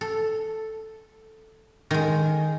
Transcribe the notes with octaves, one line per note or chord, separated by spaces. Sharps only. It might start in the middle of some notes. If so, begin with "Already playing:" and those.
A4
D#3 G#3